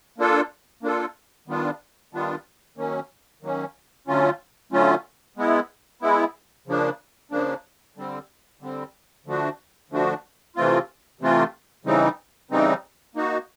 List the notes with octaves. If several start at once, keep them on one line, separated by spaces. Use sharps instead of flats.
A#3 D4 F4 A4
A#3 D4 F4 A4
D#3 G3 B3 D4 F4
D#3 G3 B3 D4 F4
D#3 F#3 A#3 C#4
D#3 F#3 A#3 C#4
D3 F#3 A3 C#4 F4
D3 F#3 A3 C#4 F4
G#3 B3 E4
G#3 B3 E4
C#3 F3 A#3 D4
C#3 F3 A#3 D4
D3 G3 C4
D3 G3 C4
D3 F3 A3 D4 F#4
D3 F3 A3 D4 F#4
C3 E3 A3 C4 F4
C3 E3 A3 C4 F4
C#3 E3 G3 C4 D#4
C#3 E3 G3 C4 D#4
A#3 D#4 F#4